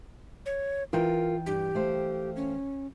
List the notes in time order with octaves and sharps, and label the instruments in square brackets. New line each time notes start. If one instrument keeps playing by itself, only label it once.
[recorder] C#5
[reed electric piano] E3 G5 [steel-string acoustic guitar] F4 [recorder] A#4
[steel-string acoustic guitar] G2 [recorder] G4
[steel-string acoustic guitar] A3 C5 F5
[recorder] C#4